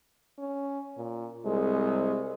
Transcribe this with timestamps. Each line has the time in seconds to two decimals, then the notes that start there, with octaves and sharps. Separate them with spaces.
0.38 C#4
0.97 A#2
1.45 C2 G#3